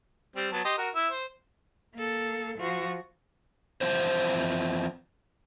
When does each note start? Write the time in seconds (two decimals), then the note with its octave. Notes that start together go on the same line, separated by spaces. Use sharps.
0.36 G3 C4
0.52 F#3 B3 A5
0.65 G4 D#5 C6
0.78 F#4 A#4
0.96 E4 E6
1.11 C5
1.95 A#3 A4
2.58 F3 F#4
3.81 E3 F3 C4 E4 C5